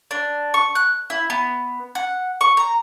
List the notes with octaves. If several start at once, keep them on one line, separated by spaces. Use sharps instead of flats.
D4
C#6
F#6
E4
B3
F#5
C#6
A#5